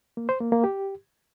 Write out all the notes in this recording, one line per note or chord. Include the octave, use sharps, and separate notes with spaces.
A#3
C5
A#3
A#3
G4